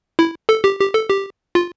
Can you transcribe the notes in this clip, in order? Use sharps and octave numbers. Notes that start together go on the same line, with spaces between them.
E4
A4
G4
G4
A4
G4
F4